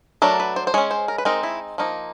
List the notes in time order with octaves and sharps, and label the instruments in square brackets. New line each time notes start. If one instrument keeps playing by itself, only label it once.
[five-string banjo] F#3 A3 D4 A#4
B4
C5
C5
G#3 C#4 C#5
C5
A#4
B4
G#3 C4 D#4 A#4
E4
F3 A#3 D#4